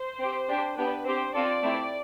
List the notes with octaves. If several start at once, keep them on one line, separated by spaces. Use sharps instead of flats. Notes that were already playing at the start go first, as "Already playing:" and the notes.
Already playing: C5
C4 G4
D4 G4
B3 D4 G4 B4
C4 G4 C5
C4 F4 A4 D5
A3 C4 E4 G4